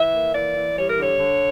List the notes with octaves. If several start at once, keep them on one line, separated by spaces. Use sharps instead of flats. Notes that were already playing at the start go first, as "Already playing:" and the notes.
Already playing: E3 E5
A#3
E3 D5
E3
G3 C#5
A#4
D3 C#5
D3